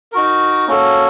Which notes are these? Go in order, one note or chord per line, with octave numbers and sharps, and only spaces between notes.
D#4 F#4 A#4
A#3 C#4 F#4 A4